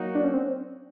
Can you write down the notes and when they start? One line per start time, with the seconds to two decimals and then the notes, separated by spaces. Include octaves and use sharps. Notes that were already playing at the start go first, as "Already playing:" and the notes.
Already playing: F#3 A#3 D#4 F#4
0.15 D4
0.24 C#4
0.33 C4